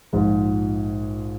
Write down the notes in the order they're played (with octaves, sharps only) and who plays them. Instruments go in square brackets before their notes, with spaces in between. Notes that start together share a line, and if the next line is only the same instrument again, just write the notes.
[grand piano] A#1 G#2 F3 G#3